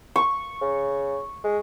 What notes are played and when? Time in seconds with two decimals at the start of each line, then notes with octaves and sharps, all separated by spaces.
0.16 C#6
0.61 C#3
1.44 G#3